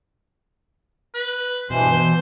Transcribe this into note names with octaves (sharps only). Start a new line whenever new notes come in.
B4
G2 B2 E3 C5
E3 G6